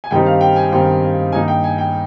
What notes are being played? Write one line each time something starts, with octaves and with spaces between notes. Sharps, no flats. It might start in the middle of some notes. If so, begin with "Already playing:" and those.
G#5
G2 D#3 G3 C4 D#4 G5
F5
G5
G#5
G2 D#3 G3 C4 D#4 G5
G2 D#3 A#3 D#4 G#5
G5
G#5
G5